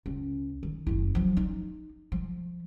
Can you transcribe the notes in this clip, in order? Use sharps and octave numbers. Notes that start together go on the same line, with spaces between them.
C#2
D#3
F#1 E4
F3 F#3
D#4
F3